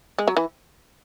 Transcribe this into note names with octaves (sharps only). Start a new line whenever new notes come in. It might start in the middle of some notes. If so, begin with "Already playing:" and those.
G#3
F#3
E3